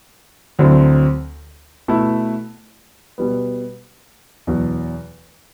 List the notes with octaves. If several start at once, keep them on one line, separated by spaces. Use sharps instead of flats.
D2 D3 F#3 C4 E4
B2 A3 E4
B2 G3 B3
E2 B2 F#3